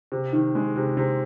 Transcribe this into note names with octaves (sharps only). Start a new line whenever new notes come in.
C3
D#3
G#3
C3
C3